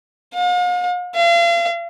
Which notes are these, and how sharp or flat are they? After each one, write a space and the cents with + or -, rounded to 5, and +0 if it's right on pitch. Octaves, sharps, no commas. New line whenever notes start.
F5 +45
F5 -40